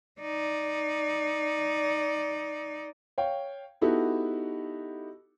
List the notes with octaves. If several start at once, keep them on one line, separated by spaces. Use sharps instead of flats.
D#4 D5
C#5 F5 G5
B3 D#4 E4 F#4 G4 A4